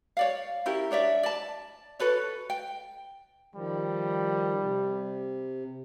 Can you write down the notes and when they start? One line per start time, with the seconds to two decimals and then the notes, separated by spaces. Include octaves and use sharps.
0.17 C#5 D5 F5
0.66 C#4 E4 G4 A#4
0.91 D4 C#5 D5 E5
1.23 D5 A5
1.99 F#4 A4 B4 C#5
2.50 G5
3.55 D#3 F3 G3
4.60 C3